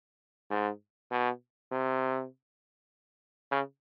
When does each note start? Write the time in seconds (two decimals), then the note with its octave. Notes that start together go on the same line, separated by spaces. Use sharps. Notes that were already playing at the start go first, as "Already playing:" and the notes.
0.50 G#2
1.11 B2
1.71 C3
3.51 C#3